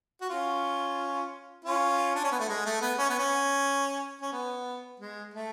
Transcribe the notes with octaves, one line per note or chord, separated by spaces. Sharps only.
F#4
C#4 F4
C#4 F4
D4
C#4
B3
A3
G#3
A3
B3
C#4
B3
C#4
C#4
B3
G#3
A3